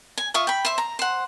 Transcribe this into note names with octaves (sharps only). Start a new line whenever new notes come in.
G#5
F4 E5 C#6 D#6
G5 B5
C5 E5
A#5
C5 F#5